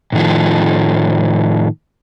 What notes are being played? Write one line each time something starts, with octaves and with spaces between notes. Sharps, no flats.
A2 D#3 F3